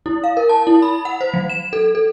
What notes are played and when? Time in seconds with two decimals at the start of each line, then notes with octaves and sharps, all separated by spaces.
0.06 E4
0.24 F5
0.37 A#4
0.49 A5
0.67 E4
0.82 B5
1.05 F#5
1.21 C5
1.34 F#3
1.50 E7
1.73 A4
1.95 A4